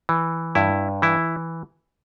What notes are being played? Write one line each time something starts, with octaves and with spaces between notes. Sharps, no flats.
E3
G2 E4
E3 E4